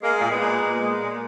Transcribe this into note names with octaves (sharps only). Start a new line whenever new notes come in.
G#3 A#3
A#2
G#3 B3
A#2
A#2
G#3
A#2